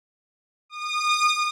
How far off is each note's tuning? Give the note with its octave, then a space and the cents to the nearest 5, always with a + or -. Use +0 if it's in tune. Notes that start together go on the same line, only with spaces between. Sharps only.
D#6 -30